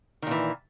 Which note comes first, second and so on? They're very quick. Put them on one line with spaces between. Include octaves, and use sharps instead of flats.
D#3 A#2 E3